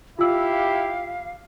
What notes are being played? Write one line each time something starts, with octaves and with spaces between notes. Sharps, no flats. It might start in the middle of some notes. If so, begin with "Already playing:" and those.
E4 F4 G4 F5 E6